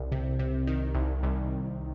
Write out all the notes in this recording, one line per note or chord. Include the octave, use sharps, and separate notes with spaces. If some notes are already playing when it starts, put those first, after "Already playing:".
Already playing: C2
C3
C3
D#3
C2
C2